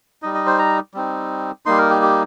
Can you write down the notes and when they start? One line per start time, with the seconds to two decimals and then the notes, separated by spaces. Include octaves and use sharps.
0.22 G3 D#4 D#5
0.35 D#5
0.46 C5
0.59 A#5
0.94 G3 C4 D#4
1.66 G3 A#3 D#4 C6
1.78 A#4
1.90 G4
2.02 G4